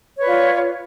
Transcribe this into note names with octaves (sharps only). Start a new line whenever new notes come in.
F4 B4 C#5 D5